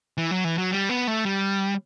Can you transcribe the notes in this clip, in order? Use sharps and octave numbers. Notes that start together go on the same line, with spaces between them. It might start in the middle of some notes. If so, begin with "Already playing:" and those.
E3
F#3
E3
F#3
G3
B3
A3
G3